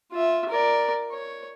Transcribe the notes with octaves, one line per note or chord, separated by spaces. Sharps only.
F4 E5
A#4 D5
C#5